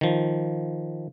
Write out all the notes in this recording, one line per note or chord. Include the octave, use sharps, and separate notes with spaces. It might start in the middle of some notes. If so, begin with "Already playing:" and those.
D#3 F3